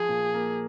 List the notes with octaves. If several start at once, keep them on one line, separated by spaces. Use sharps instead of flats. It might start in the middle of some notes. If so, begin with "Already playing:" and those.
Already playing: F3 G#4
A#2
A#3